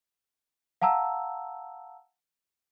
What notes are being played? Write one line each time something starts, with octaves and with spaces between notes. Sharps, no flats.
F5 F#5 A5 A#5 E6